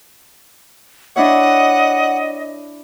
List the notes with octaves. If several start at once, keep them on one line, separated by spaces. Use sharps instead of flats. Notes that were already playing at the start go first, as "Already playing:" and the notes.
D4 E4 C#5 D#5 F#5